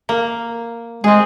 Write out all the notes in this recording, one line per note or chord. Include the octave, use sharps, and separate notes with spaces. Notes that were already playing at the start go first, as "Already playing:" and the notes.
A#3
G#3 C4 G#4